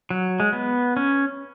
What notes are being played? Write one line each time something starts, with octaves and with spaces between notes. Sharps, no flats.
F#3
G#3
B3
C#4